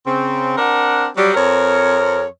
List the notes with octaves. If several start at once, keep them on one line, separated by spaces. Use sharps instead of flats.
C#3 C4
C4 D4 A#4 F#5
F#3 G3
F2 C4 A#4 C#5